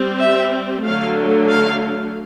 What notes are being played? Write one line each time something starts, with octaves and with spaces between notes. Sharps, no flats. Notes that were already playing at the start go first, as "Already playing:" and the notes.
Already playing: G3 C4
E5
D3 F#3 A3 F5
F5